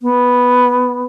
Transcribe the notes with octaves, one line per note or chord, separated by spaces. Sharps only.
B3